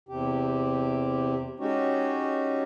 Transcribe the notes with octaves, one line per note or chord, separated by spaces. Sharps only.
E2 C3 G4
G#3 C#4 D#4 F#4 G4 C#5